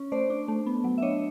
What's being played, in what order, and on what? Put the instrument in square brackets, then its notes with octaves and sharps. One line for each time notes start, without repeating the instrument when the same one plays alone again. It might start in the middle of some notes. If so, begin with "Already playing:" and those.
Already playing: [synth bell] C#4
A3 C5 D5
D4
A3
B3
F#3
E5
D4 C#5 D#5